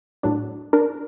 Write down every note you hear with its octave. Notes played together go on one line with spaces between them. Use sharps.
A2 F#3 D4
D4 A#4